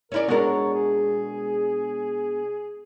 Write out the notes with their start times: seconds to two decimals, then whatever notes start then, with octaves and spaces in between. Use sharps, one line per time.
0.12 C#4 E4 A#4 D5
0.28 B2 G#3 D4 F#4 A#4 C#5
0.74 G#4